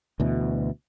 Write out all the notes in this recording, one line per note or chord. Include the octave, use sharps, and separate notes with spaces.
D2 B2 E3